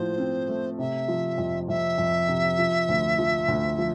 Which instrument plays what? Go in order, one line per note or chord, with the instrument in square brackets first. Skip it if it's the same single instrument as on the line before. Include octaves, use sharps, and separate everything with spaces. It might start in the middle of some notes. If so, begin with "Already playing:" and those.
Already playing: [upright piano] A2 F3 A3 [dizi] C5
[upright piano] C4
A3
[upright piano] C3 [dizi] E5
[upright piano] F3
F2
[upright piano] F2 [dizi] E5
[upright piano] F2
C3
F3
D2
F3
D2
F3